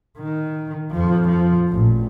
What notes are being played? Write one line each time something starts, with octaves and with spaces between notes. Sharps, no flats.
D#3
F2 F3
F3
A1 A#2